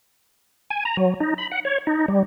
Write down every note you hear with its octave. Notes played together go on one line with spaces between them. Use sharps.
G#5
A#5
F#3
D#4
B5
F#5
C#5
D#4
G3